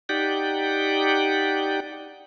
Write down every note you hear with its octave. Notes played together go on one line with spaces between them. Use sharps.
D#4 G4 D5 F#5 G5